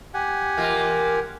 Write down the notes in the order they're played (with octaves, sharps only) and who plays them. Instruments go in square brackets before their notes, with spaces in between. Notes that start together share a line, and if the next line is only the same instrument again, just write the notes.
[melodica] G4 F#5 G#5
[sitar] E2 A#3 F4